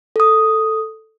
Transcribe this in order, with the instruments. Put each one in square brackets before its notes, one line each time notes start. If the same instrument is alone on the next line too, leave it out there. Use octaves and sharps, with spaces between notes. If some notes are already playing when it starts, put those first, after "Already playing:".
[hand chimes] A4 D#6